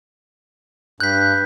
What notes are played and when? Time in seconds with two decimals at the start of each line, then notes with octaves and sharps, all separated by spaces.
1.00 G2 F#6 G6 B6